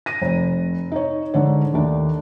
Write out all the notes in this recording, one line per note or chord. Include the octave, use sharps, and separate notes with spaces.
A#6 D#7
F1
D#4 C#5
G#2 D3 C#5
D#2 A3 D4